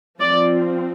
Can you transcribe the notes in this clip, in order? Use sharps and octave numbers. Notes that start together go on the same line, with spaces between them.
F3 C4 D5